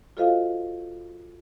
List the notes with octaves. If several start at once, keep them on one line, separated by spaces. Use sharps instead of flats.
F4 F#4 A4 C5 D#5 F5